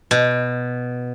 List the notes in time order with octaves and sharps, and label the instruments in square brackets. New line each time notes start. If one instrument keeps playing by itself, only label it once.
[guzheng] B2